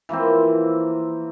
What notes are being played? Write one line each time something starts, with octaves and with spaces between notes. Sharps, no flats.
E3 F3 A#3 C4